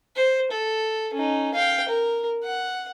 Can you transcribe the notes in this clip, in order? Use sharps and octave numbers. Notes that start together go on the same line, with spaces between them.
C5
A4
C#4 D#4
F5 G5
A#4
F#5